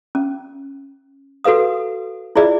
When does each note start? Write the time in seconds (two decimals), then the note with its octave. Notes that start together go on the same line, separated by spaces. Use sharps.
0.15 C#4
1.44 F#4 A4 B4 F5 D#6
2.36 E4 F4 G#4 D5 E5